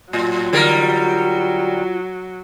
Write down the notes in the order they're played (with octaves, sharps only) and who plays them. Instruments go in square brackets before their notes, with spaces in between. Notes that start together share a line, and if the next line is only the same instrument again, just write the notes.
[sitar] A2 [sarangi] F#3 [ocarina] F4
[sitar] D3 G3 A#4